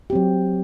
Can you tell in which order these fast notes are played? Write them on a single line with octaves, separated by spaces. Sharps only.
G4 C4 F#3